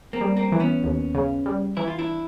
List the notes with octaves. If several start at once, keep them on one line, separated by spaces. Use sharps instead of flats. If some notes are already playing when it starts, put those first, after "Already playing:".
A#3 C4
G3
A#3 C4
E3
B3 C#4
D#2
C#3
G3
E3 E4
F4
D4 E4